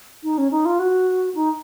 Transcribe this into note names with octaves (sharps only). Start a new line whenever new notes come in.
D#4
C#4
D#4
F4
F#4
D#4